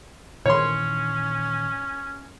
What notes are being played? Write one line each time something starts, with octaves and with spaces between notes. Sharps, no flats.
A#2 D#3 E3 C#4 C#5 C6